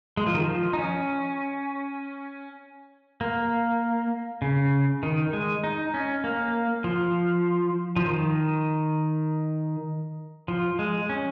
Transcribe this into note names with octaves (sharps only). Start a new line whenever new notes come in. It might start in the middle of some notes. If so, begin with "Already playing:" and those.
G#3
F3
D#3
F3
D#4
C#4
A#3
C#3
D#3
G#3
D#4
C#4
A#3
F3
F3
D#3
F3
G#3
C#4